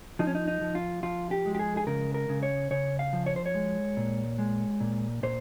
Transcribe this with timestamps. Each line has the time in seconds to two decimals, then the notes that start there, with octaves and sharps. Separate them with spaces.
0.19 F3 D#4
0.27 C#4
0.35 D#4
0.48 D#4
0.61 F3
0.75 F4
1.03 F3 F4
1.31 G4
1.46 G#3
1.55 G4
1.59 G#4
1.77 G#4
1.87 C#3 A#4
2.14 A#4
2.29 C#3
2.43 C#5
2.71 C#3 C#5
2.99 F5
3.13 F3
3.26 C#5
3.36 C5
3.46 C#5
3.55 G#3
3.97 A#2
4.39 G#3
4.80 A#2
5.23 A#2 C5